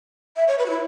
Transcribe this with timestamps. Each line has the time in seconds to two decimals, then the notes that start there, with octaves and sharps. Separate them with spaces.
0.36 E5
0.48 C#5
0.58 B4
0.66 F#4
0.70 E4